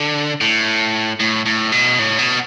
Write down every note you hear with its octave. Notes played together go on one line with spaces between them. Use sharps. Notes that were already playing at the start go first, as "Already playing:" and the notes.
Already playing: D3
A2
A2
A2
B2
A2
B2